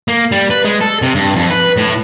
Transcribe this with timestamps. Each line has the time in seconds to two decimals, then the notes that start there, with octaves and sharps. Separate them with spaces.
0.08 A#3
0.32 G3
0.50 B4
0.65 G#3
0.81 A4
1.02 C3
1.15 G2
1.36 F2
1.51 B4
1.77 A2